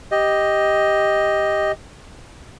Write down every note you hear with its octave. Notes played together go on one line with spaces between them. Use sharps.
G4 D#5